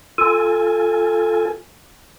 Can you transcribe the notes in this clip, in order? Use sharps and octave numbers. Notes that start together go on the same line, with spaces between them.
F4 A4 G#5